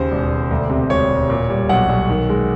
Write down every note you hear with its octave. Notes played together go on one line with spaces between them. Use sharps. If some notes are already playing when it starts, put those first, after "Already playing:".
Already playing: D#2 C#3 C5
E1
E1
D2
C3
E1 C#5
E1
A#2
G3
B1 F#5
B1
D#3
G#3